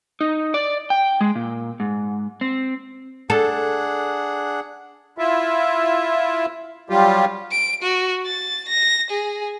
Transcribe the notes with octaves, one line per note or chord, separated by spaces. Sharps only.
D#4
D5
G5
G#3
A#2
G#2
C4
D4 G#4 A4 F#5
E4 F4 E5
F#3 G3 F4 G4
D7
F#4
A6
A#6
G#4